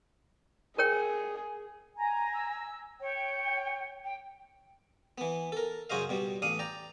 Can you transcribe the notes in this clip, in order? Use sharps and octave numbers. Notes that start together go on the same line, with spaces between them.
G#4 A#4 C#5 G5
G#5 A#5
E6
C#5 G5
G5
E3 B3
A4 A#4
F#2 C#3 F#4 C5 D#5 F5
B2 G3
A1 D4 F5 D#6
D5 G5 A#5